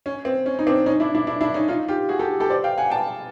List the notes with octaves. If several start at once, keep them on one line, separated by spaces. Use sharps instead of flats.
C#4
C4
C#4
D#4
C4 D4
C#4 D#4
D4 E4
D4 E4
D4 E4
D4 E4
C#4 D#4
D#4 F4
F4 G4
F#4 G#4
G4 A4
G4 A4
C5 D5
F5 G5
F#5 G#5
G5 A5